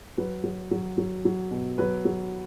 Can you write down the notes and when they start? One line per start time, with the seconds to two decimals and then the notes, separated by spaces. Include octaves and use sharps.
0.17 F#3 B4
0.44 F#3
0.71 F#3
0.98 F#3
1.25 F#3
1.51 B2
1.78 F#3 B4
2.05 F#3